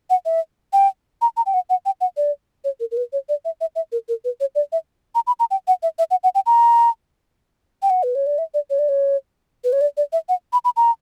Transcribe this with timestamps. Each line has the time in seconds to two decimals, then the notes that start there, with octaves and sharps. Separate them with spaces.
0.10 F#5
0.25 E5
0.73 G5
1.22 A#5
1.37 A#5
1.46 G5
1.54 F#5
1.70 F#5
1.86 G5
2.01 F#5
2.17 D5
2.64 C#5
2.80 A#4
2.91 A#4
2.97 B4
3.13 C#5
3.29 D5
3.45 E5
3.61 E5
3.76 E5
3.92 A#4
4.09 A#4
4.25 B4
4.40 C#5
4.55 D5
4.72 E5
5.15 A#5
5.27 B5
5.40 A#5
5.51 G5
5.68 F#5
5.83 E5
5.99 E5
6.11 F#5
6.24 F#5
6.35 G5
6.46 A#5
7.82 G5
7.90 F#5
8.03 B4
8.15 C#5
8.27 D5
8.38 E5
8.54 D5
8.70 C#5
8.79 D5
8.89 C#5
9.64 B4
9.73 C#5
9.81 D5
9.97 D5
10.13 E5
10.29 F#5
10.53 B5
10.65 B5
10.77 A#5